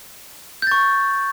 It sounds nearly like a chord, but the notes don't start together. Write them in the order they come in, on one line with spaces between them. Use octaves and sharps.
G6 A6 C#6